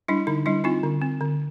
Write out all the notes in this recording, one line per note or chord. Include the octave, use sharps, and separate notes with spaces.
G3 D4 E4
D3 D#4
G3 D4 E4
C4 D#4 F4
D3
C4
D3